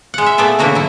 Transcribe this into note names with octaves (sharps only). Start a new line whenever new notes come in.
G#3 F#5
E5
A#2 A3 B3 G#4 D5 E5
D3 E3 A#3 F#4 C#5
F#3 E4